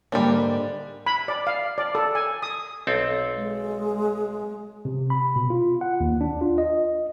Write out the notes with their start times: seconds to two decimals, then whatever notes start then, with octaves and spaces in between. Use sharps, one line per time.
0.12 G#2 D3 G3 A#3 D4
1.06 B5
1.28 D5
1.47 F5
1.78 D5
1.95 A4
2.15 G#5
2.43 D#6
2.87 B1 C4 A4
3.35 G#3
4.85 C3
5.10 B5
5.36 B2
5.50 F4
5.81 F#5
6.01 D#2
6.21 D4
6.41 F4
6.58 D#5